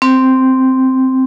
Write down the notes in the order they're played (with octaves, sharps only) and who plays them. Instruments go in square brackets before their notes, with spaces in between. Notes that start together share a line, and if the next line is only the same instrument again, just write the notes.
[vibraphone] C4